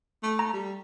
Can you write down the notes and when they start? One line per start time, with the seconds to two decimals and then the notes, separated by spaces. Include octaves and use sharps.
0.23 A3
0.39 A#5
0.54 G3